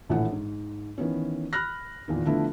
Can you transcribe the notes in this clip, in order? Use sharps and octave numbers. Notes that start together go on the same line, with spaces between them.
A#1 A2 E3 F#5
G#2
D#3 E3 B3 C#4
B5 F6 F#6 A#6
E2 A#2 D#3
D3 F3 A3 B3 D4 E4